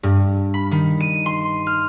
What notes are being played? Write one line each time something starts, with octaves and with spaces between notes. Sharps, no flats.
G2
B5
D#3
D#7
C6
F6